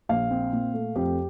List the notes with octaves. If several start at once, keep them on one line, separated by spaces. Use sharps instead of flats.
A#1 F5
C4
A#2
A3
F2 G4